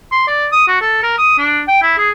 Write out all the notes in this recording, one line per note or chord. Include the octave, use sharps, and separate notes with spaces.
C6
D5
D#6
F#4
A4
A#4
D#6
D4
G5
E4
G#4